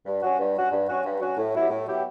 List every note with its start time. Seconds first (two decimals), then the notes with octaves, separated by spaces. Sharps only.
0.06 G2
0.22 F#3 C#4 F#4
0.39 G2
0.56 F#3 C#4 F#4
0.72 G2
0.88 F#3 C#4 F#4
1.05 G2
1.20 F#3 C#4 F#4
1.37 A2
1.53 F#3 B3 E4 G4
1.70 A2
1.86 F#3 B3 E4 G4